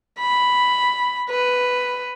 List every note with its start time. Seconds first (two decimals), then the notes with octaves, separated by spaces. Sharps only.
0.20 B5
1.30 B4